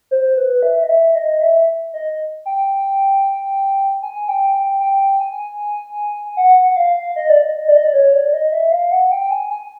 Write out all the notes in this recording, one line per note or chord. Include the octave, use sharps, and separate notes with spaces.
C5
B4
E5
D#5
E5
D#5
E5
D#5
G5
G#5
G5
G5
G5
G#5
F#5
F#5
F5
D#5
D5
D#5
D5
D#5
D5
C#5
D5
D#5
E5
F5
F#5
G5
G#5
G#5